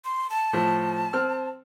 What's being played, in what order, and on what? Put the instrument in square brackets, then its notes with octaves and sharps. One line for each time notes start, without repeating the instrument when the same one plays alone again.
[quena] C6
A5
[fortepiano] A2 F3
C4 F6